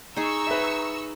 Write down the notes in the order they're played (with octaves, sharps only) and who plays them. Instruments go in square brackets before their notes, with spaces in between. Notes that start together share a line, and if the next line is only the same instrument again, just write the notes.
[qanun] D#4 G#4 [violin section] A#5 C#6 E6
[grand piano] B4 E5